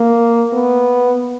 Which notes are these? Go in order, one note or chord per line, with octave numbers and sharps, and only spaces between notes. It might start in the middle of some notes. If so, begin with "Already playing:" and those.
Already playing: A#3
B3